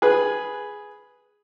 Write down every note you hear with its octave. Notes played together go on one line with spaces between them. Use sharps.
G#4 B4